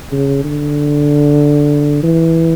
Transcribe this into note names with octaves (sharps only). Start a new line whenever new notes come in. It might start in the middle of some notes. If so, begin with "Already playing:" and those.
C#3
D3
E3